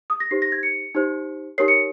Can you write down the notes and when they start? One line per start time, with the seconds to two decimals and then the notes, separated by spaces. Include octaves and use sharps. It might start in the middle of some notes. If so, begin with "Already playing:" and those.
0.10 D#6
0.20 A#6
0.31 D#4 G4 C5 C7
0.42 A#6
0.52 G#6
0.63 C#7
0.95 D#4 G4 C5
1.58 D#4 G4 A#4 C#5 C7
1.68 C#7